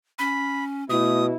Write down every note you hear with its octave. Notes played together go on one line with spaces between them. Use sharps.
C#4 B5
B2 A3 E4 D#6